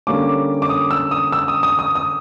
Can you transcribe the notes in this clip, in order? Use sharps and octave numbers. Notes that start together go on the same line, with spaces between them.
D3 G3 A#3 C#4 D6
D6
D#6
E6
D#6
E6
D#6
D#6
D#6
D#6